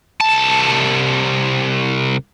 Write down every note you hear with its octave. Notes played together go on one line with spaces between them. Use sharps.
C2 A5